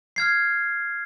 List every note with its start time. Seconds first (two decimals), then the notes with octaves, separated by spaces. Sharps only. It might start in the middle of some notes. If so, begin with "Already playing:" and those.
0.16 F6 G#6 C7